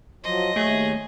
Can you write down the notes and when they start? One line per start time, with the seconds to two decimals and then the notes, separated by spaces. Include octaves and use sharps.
0.24 F3 F#3 C5 D#5
0.56 D#2 A3 G#4 C#5